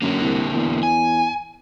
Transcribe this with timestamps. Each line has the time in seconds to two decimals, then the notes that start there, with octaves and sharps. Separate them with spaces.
0.02 F#2 D3 A#3
0.22 C2
0.54 E2
0.83 G#5